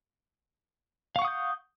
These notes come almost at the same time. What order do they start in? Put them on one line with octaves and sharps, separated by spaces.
F5 C#6 F#5 D#6 G6